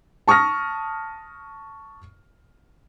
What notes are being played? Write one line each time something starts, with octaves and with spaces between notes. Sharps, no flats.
A5 C#6 D#6 F6 A#6